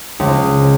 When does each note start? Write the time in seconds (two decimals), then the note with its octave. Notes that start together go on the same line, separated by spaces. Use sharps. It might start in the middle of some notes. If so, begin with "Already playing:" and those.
0.20 C#2